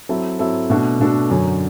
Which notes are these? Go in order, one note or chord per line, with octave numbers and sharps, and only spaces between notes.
F#3 C4 E4 A4
F#3 C4 E4 A4
B2 A3 D4 F#4 A4
B2 A3 D4 F#4 A4
F#2 D3 F#3